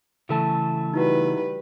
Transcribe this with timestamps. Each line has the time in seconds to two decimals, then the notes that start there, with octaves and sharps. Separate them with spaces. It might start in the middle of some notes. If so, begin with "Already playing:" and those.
0.29 C#3 E3 A3 E4 A4 A5
0.94 G3 D#4 E4 F#4 B4